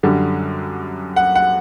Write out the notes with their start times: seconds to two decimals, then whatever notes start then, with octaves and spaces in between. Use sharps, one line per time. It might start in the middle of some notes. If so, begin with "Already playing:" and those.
0.03 F#2 D3 G3
1.16 F#5
1.35 F#5